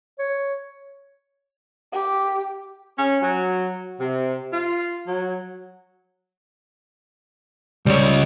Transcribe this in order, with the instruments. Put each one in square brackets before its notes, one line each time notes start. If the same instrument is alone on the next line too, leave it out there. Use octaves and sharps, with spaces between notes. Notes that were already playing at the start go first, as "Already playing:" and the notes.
[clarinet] C#5
[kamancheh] G4
[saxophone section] C#4
F#3
C3
F4
F#3
[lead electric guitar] C#2 C#5 [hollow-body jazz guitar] G3